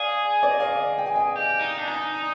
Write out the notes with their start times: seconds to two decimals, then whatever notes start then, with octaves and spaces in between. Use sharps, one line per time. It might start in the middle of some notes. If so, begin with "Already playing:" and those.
Already playing: G#4 D5 F5
0.43 D5
0.51 D#5
0.60 D5 F5
0.98 G5
1.06 G#5
1.15 D#5 G5
1.36 G4
1.61 D#4
1.78 D4
1.87 D#4